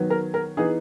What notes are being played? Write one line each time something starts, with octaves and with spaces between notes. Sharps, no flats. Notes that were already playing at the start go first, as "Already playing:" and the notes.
Already playing: D#3 F#3 B3
A#4
A#4
E3 B3 D#4 G#4